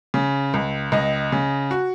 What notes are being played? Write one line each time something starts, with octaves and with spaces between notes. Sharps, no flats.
C#3
C#2
C#2 D#5
C#3
F#4